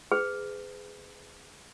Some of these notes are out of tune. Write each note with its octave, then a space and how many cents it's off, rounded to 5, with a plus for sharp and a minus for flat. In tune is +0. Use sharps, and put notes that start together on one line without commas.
G#4 +0 B4 +40